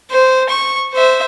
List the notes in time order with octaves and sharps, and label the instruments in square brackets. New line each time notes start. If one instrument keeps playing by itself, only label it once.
[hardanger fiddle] C5
C#6
C5 E5